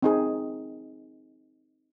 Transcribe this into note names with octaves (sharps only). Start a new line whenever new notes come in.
C4 D#4 G#4